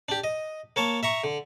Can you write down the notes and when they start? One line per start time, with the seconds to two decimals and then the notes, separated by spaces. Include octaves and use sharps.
0.09 D4 G4
0.24 D#5
0.76 A#3 C#5 A5
1.03 E5 A#5 C#6
1.24 D3